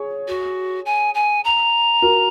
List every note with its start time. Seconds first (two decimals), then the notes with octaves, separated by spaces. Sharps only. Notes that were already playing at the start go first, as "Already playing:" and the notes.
Already playing: G#4 C#5
0.28 F#4
0.86 G#5
1.14 G#5
1.44 A#5
2.02 F#4 A#4